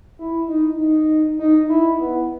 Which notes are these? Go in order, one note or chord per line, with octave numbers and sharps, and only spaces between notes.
E4
D#4
D#4
D#4
E4
B3